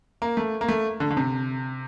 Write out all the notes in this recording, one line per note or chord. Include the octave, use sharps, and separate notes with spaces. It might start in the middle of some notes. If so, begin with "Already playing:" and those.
A#3
A3
A#3
A3
D3
D3
C3